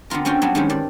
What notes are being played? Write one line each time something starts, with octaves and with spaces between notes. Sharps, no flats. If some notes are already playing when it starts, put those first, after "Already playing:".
D3 B3 C4 F4 A#4
C4 C#4 F4 F#4 G5
F#3 G3 B3 D4
D#3 G3 G#3 C4 C#4
G2 D5